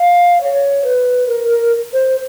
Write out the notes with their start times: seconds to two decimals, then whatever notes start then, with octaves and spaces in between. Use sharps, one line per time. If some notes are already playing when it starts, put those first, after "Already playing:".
Already playing: F5
0.41 C#5
0.84 B4
1.28 A#4
1.50 A#4
1.93 C5